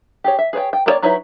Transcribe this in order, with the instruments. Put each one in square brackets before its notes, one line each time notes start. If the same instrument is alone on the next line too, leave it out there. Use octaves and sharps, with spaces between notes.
[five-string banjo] G4 G#4 C#5
E5
G#4 B4 C#5 G5
G5
A#3 B3 B4 C#5 D5
F#3 D#4 E4 B4 C#5